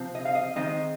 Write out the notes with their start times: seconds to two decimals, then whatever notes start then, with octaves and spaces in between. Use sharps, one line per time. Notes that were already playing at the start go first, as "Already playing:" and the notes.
Already playing: C3 F3 C4
0.15 D#5
0.25 F5
0.35 D#5
0.56 D#3 G#3 C4 D#5